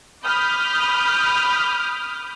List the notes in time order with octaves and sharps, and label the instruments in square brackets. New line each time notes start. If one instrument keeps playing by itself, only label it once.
[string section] B5 D6 D#6 F6 G6